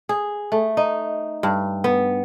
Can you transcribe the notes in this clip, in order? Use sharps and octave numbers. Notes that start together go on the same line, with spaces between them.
G#4
A3
D#4
G2
B3